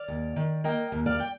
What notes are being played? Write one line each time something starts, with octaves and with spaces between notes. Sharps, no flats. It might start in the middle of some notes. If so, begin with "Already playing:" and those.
Already playing: D5 F5
D#2
D#3
A#3 D#5 G5
D#2
D5 F5
G5